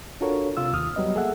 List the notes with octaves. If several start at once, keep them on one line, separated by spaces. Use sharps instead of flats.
D4 F4 F#4 A4 A#4 C#5
C3 F4 E6
D#2 D#6 F6
F#3 G3 B3 D#5
A#3 G#4 A4 E5 F#5